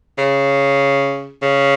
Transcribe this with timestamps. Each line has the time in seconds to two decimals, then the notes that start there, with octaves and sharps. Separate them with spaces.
0.18 C#3
1.42 C#3